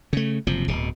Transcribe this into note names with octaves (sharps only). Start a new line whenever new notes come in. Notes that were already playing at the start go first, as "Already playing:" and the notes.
C#3 A3
F#1 C3 F3
D1 B2